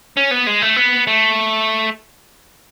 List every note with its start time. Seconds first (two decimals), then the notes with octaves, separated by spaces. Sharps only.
0.17 C#4
0.31 B3
0.47 G#3
0.62 A3
0.76 B3
1.07 A3